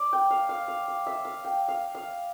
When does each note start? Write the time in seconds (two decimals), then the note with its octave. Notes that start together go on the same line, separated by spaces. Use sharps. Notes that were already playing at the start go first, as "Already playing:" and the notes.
Already playing: D5
0.13 G5
0.31 F5
0.49 F5
0.68 F5
0.88 F5
1.06 E5
1.25 F5
1.44 G5
1.68 F5
1.95 F5